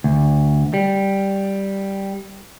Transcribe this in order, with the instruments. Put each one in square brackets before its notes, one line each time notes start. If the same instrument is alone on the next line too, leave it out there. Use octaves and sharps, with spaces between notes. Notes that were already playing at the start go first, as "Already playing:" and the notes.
[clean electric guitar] D2
G3